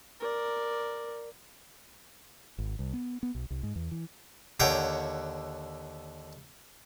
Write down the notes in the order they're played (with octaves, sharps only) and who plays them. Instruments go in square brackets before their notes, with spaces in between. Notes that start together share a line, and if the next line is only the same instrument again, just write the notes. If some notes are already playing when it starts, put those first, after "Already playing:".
[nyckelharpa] A#4 D5
[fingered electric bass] G#1
C2
B3
B3
B1
C2
G#2
E2
E3
[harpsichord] D#2 D3 C#5 F#5 G5